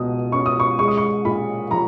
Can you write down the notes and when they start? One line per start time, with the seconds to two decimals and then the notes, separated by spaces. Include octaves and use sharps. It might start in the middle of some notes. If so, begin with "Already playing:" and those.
Already playing: C#2 B2 D#6
0.32 C#4 C#6
0.46 D#6
0.59 C#6
0.79 G#3 C#6
0.88 D#6
0.97 C#6
1.25 A#2 B5
1.71 F3 A#5